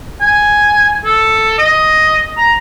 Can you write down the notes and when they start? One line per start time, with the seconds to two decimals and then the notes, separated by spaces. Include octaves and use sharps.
0.22 G#5
1.05 A4
1.59 D#5
2.38 A#5